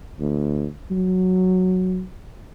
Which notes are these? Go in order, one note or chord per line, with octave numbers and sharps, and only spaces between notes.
D2
F#3